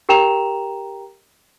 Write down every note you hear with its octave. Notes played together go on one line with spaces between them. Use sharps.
G4 A#4 G5 A#5 E7 F7